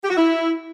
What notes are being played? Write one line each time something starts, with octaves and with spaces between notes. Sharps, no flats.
G4
F#4
E4